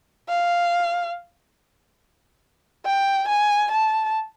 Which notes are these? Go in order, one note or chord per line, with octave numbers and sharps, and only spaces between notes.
F5
G5
G#5
A5